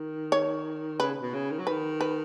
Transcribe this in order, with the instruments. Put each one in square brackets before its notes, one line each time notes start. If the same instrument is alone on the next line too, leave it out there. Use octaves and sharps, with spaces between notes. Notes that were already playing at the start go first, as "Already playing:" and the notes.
Already playing: [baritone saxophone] D#3
[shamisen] C#5
[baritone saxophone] C#3 [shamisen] B4
[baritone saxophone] B2
C#3
D#3
F#3
[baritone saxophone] D#3 [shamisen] B4
[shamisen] B4